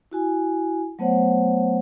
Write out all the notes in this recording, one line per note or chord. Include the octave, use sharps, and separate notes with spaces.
E4 F#4 G#5
F#3 A3 B3 C5 C#5 F#5